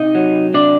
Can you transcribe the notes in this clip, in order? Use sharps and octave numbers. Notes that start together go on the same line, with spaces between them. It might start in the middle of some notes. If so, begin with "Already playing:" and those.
Already playing: C3 D#4 D#5
F#3
C3 D4 D5